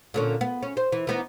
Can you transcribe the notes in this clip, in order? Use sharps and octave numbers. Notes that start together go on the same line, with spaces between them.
A#2 D3 C#4
B3
C#4
C5
E3
E3 B3 D#4